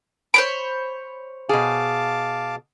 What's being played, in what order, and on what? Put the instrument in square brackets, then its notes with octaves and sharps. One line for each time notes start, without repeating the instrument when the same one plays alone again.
[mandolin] C5 C#5 B5 [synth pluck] D7
[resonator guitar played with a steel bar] B2 G#4 [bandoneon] F5 A5 D6